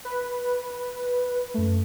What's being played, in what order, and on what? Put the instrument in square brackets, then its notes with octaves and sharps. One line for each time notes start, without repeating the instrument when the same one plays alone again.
[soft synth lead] B4
[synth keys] F#2 A3